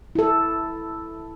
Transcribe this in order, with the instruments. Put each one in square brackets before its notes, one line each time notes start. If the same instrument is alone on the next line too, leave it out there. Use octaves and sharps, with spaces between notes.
[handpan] E4 A4